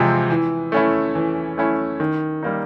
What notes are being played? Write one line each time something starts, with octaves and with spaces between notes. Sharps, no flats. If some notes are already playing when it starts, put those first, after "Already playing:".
Already playing: E2 C3 F3 G#3 C4
E3
A3 C#4 E4
E3
A3 C#4 E4
D#3
G3 A#3 D#4